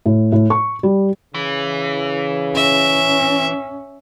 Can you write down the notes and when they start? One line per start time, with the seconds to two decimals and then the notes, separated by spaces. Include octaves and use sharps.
0.06 A2
0.32 A2
0.50 C#6
0.83 G3
1.34 C#3 E3
2.56 C#4 E5